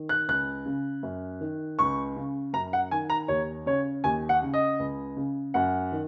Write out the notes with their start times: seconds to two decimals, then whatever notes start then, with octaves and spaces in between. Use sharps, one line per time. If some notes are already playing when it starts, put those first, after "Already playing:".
Already playing: D#3
0.09 F#6
0.28 C#2 F#6
0.66 C#3
1.03 F#2
1.41 D#3
1.79 C#2 C#6
2.17 C#3
2.53 F#2 A#5
2.73 F#5
2.91 D#3 G#5
3.10 A#5
3.28 D#2 C#5
3.66 C#3 C#5
4.04 D#2 G#5
4.29 F#5
4.42 C#3
4.54 D#5
4.79 C#2
5.17 C#3
5.54 F#2 F#5
5.92 D#3